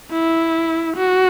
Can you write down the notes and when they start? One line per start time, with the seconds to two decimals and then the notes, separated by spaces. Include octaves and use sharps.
0.11 E4
0.97 F#4